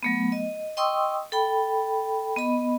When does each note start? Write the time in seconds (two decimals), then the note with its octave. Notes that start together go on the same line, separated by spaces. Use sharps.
0.03 F#3 A3 B3
0.32 D#5
0.77 D#5 G5 C6 C#6 D#6 E6
1.32 A4 G5 B5
2.36 B3 D#5 B5